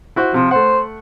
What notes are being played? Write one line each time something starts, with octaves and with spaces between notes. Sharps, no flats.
E4 F#4 C5
C3 F3
A3 C5 F#5